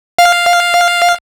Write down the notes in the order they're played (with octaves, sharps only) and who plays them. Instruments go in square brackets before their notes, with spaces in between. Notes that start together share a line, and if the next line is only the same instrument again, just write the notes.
[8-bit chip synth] F5